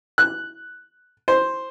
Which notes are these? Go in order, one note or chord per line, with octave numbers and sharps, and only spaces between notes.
F#6
C5